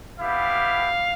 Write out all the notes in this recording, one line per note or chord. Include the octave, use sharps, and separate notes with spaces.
G3 B3 E4 G4 F5